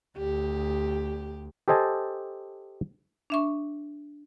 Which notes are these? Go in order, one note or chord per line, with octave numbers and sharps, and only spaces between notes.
D2 G4
G4 A4 C5 D#5 G#5 A5
D4 E5 C#6